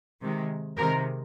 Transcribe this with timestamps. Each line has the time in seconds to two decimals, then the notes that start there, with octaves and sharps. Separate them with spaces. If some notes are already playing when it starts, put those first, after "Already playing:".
0.22 C3 D#3 G#3
0.78 C3 D#3 G#3 G4 A#4